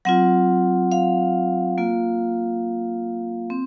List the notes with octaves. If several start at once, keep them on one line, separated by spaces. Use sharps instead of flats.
F#3 C4 F4 F#5
F5
A#3 F4
C4